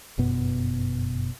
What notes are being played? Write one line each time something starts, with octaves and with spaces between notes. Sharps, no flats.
G1 F#2 B2 B3